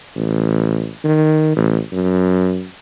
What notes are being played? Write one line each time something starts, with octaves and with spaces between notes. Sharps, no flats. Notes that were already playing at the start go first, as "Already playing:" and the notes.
A1
D#3
A1
F#2